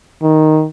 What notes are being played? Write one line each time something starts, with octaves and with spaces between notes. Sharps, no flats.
D#3